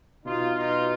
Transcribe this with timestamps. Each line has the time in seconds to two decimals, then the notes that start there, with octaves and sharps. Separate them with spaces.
0.25 B2 D#4 F4
0.57 D#4 F4